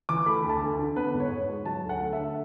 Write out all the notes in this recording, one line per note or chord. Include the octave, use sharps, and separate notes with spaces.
E3 D6
A3 B5
D2
A5
D2
D3
B3 B4
G#2
C#5
G#2
G#3
F#3 A5
D2
F#5
A3
D3 E5